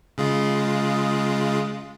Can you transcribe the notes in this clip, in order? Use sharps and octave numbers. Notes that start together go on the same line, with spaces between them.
C#3 G#3 F4